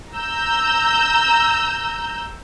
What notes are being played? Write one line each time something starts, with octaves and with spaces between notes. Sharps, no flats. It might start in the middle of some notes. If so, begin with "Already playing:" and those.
A#5 E6 G6